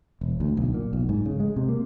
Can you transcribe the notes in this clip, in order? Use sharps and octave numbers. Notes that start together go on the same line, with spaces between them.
E1
D2
B1
A#2
B1
G#2
C#3
G#3
C3
A#3